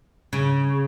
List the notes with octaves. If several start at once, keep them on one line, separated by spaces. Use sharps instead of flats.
C#3